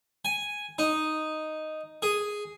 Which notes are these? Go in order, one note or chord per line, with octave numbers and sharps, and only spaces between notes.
G#5
D#4
G#4